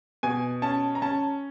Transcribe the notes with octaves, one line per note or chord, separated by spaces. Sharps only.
B2 G#5
C#4 A5
A#5
C#4 A5